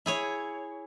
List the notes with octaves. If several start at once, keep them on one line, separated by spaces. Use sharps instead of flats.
E4 G#4 C#5